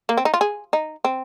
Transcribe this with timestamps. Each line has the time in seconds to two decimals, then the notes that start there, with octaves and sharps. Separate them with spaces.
0.09 A#3
0.18 C4
0.25 D#4
0.34 F4
0.41 G#4
0.73 D#4
1.05 C4